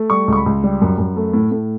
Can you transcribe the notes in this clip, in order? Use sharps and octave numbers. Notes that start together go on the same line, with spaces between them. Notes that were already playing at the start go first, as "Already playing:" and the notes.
Already playing: A3
G3 C#6
C#2 C#6
B5
C#2
G3
F#2
F#2
A3
A2
A2